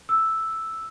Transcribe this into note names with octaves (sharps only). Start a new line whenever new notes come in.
E6